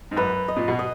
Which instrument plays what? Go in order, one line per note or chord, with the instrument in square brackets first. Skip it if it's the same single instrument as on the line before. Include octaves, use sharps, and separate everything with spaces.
[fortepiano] G#2
[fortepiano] F#2 [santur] B4
[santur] D#5
[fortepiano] A#2
B2
[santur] D#5